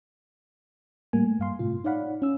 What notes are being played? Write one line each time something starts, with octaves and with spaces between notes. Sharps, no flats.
A2 G3 A#3 G#5
A3
G2 F5 C6
A2 C3 F4
D#4 C#5 D5 F5 F#5 B5
C#4 E6